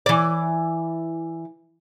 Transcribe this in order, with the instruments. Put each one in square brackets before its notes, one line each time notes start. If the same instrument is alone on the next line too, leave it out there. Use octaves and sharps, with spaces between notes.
[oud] E3 D5